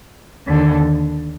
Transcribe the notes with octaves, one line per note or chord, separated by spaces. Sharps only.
D#2 D3